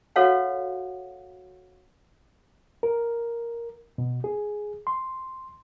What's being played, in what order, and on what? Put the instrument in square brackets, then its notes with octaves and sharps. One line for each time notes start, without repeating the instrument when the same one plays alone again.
[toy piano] F#4 A4 B4 C#5 F5 F#5
[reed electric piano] A#4
B2
G#4
C6